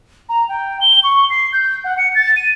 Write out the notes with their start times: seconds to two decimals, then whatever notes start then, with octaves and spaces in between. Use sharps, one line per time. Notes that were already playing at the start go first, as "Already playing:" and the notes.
0.29 A#5
0.49 G5
0.81 G7
1.04 C#6
1.30 C7
1.53 G6
1.84 F#5
1.97 C#7
2.15 A6
2.36 D#7